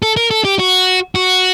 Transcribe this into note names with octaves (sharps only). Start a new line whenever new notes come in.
A4
A#4
A4
G4
F#4
F#4